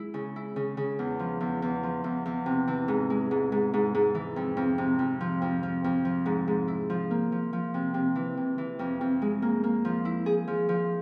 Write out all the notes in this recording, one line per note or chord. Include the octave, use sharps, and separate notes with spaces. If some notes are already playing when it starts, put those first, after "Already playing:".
Already playing: G#3 E4
C#3
E4
C#3
C#3
E2
F3
E2
E2
F3
E2
E2
C3
E3
G#2
G#3
G#2
G#2
G#2
G#2
E3
F2
F2
C3
F2
F3
F2
F3
F2
F3
G#2
G#2
E4
F3
A#3
F3
F3
C3
C3
E3
C3
E3
F2
F2
G#3
A#3
A#3
F3
E4
G#4
F3
F3